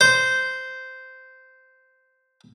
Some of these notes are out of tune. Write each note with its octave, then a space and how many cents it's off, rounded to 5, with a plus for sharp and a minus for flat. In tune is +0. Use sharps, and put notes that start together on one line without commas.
C5 -10